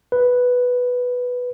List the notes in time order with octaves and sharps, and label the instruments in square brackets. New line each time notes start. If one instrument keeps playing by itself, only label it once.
[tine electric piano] B4